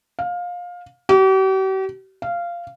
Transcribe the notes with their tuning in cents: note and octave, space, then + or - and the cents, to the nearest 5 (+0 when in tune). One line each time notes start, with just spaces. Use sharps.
F5 +20
G4 -45
F5 -15